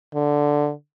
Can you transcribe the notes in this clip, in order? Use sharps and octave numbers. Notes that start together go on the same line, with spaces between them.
D3